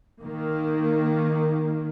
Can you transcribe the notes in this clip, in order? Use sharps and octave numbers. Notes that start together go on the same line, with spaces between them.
D#3 A#3